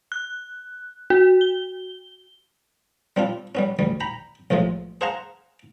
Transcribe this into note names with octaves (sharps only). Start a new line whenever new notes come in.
F#6
F#4
G7
G3 C4 D4 F4
G3 B3 C#4
A1 D2 G3
G5 A#5 B5
B1 A2 C3 F3 G#3
G#4 C5 F5 F#5 A5 A#5